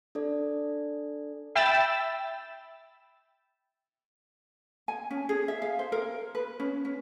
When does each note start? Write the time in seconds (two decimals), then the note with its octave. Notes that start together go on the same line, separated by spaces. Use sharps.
0.15 D4 A4 D5
1.55 E5 G5 B5 E6 A6 E7
4.88 G#5
5.11 C#4
5.29 G#4
5.48 E5
5.62 F5
5.79 C5
5.92 A#4
6.35 B4
6.60 C#4
6.85 C#4